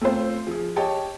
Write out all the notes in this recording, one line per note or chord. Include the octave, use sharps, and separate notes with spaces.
A3 C4 F4 C5
F3 G#4
G4 C#5 D#5 G5 A5